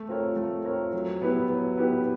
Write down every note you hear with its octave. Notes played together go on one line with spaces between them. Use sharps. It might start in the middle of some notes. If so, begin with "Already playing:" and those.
Already playing: A3
C4 F4 A#4 C#5
A3
C4 F4 A#4 C#5
F#3
B3 E4 G4 B4
F#3
B3 E4 G4 B4